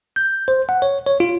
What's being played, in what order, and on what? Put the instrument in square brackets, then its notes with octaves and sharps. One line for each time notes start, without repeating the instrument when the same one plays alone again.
[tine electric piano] G6
C5
F#5
C#5
C#5
F4